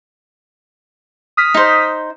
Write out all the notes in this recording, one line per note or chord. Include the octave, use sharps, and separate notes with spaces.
D#6 F6 B6
D#4 C5